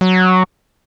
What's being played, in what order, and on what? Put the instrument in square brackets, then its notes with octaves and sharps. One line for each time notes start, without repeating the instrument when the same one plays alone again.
[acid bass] F#3